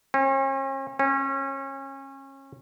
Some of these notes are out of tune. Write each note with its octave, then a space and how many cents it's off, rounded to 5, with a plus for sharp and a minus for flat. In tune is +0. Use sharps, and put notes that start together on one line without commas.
C#4 -45
C#4 -30